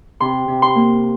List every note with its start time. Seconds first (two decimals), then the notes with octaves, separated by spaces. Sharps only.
0.20 C3 C6
0.48 C3
0.62 C6
0.76 A#3